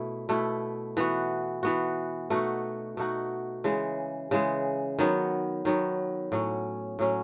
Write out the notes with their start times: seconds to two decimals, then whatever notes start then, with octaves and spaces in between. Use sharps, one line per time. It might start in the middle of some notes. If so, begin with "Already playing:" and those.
Already playing: B2 A3 E4
0.29 B2 A3 E4
0.97 E3 B3 F#4
1.63 E3 B3 F#4
2.30 B2 A3 D#4 F#4
2.97 B2 A3 D#4 F#4
3.64 C#3 E3 G#3
4.31 C#3 E3 G#3
4.99 D#3 F#3 B3
5.65 D#3 F#3 B3
6.32 A2 F#3 C#4
6.99 A2 F#3 C#4